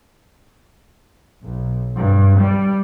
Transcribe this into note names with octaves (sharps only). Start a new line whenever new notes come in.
B1
G2
G3